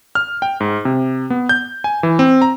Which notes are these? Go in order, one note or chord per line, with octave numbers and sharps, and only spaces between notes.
F6
G5
G#2
C3
B3
G6
G#5
E3
C4
A#5